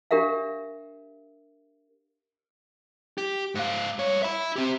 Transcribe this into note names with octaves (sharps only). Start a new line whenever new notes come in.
D4 G4 A#4 E5 F5
G4
G#2 F5
G2 C#5
E5 B5
C4 G4